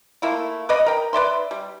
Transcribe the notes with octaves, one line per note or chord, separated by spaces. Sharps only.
A3 A#3 E4 F4
B4 D5 D#5 B5
A#4 G5
B4 D5 E5 C6
G3